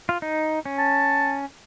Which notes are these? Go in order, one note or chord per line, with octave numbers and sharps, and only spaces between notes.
F4
D#4
C#4
A5